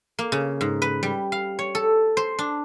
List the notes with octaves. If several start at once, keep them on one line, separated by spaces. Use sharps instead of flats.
A#3
C#3
G#2
B4
G3
F5
C#5
A4
C5
D4